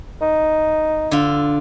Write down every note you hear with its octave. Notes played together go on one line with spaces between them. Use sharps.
D#4
D3 F4